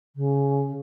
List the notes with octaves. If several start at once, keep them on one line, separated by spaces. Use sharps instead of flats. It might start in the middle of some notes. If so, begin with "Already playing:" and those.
C#3